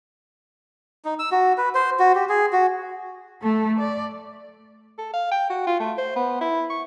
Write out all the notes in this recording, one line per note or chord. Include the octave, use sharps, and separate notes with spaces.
D#4
E6
F#4
B4
C5
F#4
G4
G#4
F#4
A3 A4
D5
A4
F5
G5
F#4
F4
A3
C5
B3
E4
C#6